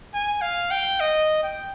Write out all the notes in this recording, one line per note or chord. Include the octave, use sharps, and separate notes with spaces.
G#5
F5
G5
D#5
G5